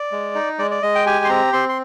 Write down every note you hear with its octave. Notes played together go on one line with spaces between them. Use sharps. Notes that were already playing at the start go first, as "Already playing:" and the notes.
Already playing: D5
G#3
D#4
G#3 D5
D5
G#3 D#5
G5
G4 G#5
C6
C4 A#5
C4 C6
C6